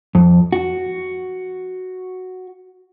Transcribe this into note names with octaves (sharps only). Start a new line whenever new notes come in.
F2
F#4